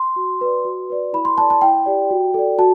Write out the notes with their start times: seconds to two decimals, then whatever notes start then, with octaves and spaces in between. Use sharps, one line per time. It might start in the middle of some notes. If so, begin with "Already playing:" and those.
Already playing: C6
0.16 F#4
0.41 B4 D5
0.65 F#4
0.90 B4 D5
1.13 E4 B5
1.25 C6
1.37 A4 D5 A5
1.50 A5
1.61 E4 G5
1.86 G4 D5
2.11 F#4
2.34 A4 D5
2.58 F#4 A5